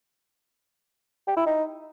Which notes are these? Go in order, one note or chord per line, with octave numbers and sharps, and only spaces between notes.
G4
E4
D#4